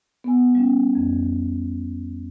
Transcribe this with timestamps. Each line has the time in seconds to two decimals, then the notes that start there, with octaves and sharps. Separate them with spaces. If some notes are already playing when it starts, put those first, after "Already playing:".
0.24 B3 G#5
0.55 G3 C#4
0.95 F2